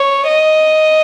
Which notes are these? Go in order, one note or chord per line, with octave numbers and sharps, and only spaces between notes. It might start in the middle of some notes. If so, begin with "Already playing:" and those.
Already playing: C#5
D#5